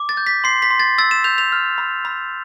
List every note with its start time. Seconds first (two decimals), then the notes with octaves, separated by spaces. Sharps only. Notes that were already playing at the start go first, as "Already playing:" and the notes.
Already playing: D6
0.09 A6
0.17 G6
0.27 B6
0.44 C6 C7
0.62 B6
0.71 C6
0.80 A6
0.98 E6 A6
1.11 E7
1.24 G6 F7
1.38 F7
1.52 F6
1.78 B5
2.05 B5